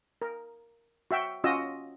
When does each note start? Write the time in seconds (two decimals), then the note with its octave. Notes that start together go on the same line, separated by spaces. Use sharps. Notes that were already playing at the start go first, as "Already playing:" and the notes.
0.22 A#4
1.11 F#4 E5 G5
1.44 C#4 F4 F#4 D#5 E6